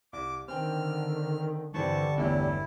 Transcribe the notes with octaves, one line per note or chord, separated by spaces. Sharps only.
C2 D6
D3 D#3 C4 G5 F6
G2 D3 E3 G3 C4 A5 C#6
G1 E2 A3 E4 C#5